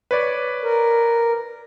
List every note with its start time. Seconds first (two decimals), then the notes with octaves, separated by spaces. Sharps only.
0.11 B4 C#5 D5
0.64 A#4